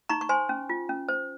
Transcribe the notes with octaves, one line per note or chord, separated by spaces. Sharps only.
D#4 A#5 C#6
C#6
C5 G#5 C6
C#4
F4
C#4
C5